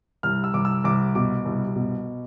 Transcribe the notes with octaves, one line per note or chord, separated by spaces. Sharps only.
C2 F6
E6
C2 D6
E6
C2 D6
B2 D6
C2
B2